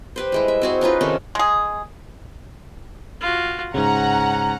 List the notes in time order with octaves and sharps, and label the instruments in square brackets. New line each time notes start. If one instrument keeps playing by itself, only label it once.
[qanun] G4 B4 C5
G3 G#3 E4
E5
C4 F#4 G#4
C#4 D#4 F4 B4
C3 D#3 C#4 A4
[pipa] G#3 G#4
[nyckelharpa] F4 F#4
[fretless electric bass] G#2 C#3 [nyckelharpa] C#4 [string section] F#5 A#5